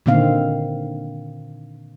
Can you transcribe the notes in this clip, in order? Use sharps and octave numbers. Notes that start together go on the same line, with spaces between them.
A#2 D3 D#3 C4 F5